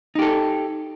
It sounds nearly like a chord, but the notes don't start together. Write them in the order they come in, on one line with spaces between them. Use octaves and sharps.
D#4 G4 A4